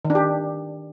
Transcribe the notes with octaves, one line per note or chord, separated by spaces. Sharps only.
D#3
D4
G4